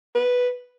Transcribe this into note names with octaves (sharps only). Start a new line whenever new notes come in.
B4